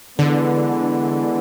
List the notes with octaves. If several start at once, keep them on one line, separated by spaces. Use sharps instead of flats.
D3 E3 G#3 B3 D4